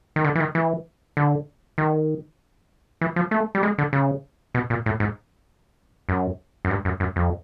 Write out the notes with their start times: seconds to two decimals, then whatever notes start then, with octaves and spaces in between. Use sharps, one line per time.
0.16 D#3
0.24 D3
0.35 E3
0.40 D#3
0.55 E3
1.17 D3
1.78 D#3
3.01 E3
3.16 F3
3.31 A3
3.55 G3
3.63 G#3
3.78 D3
3.93 C#3
4.54 B2
4.70 A#2
4.86 A2
5.00 G#2
6.09 F#2
6.65 F#2
6.70 G2
6.85 F#2
7.00 F#2
7.16 F2